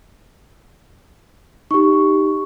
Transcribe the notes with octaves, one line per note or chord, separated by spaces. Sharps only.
D#4 G4 C#6